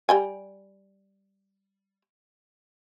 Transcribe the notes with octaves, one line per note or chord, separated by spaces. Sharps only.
G3 G5 G#5